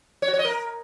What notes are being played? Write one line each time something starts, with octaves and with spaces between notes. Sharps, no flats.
C#5
F#4
C#5
D#5
A#4